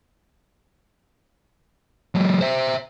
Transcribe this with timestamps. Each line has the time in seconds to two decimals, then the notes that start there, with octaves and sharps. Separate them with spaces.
2.15 F#3 G#3
2.41 C5 E5